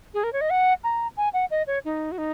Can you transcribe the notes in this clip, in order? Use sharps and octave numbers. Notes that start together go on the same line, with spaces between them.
G#4
A#4
C#5
D#5
F#5
A#5
G#5
F#5
D#5
C#5
D#4
F#4
D#4